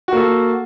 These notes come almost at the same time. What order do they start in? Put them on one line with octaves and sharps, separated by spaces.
F#4 A#3 A4